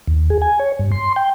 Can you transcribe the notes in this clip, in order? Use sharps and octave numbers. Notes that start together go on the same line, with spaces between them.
D#2
G#4
G#5
C#5
G2
C6
G5